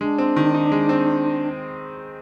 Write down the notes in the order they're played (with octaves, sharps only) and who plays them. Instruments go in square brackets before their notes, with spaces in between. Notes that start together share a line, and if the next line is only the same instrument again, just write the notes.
[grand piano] G#3 [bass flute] D4
[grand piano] C4
D#3
D#4
G#3
C4